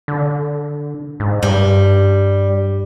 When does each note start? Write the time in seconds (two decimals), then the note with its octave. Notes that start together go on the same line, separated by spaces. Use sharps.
0.08 D3
1.20 G#2
1.43 G2 G3